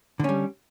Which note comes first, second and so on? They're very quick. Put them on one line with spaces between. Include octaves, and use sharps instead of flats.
D3 C#4 G3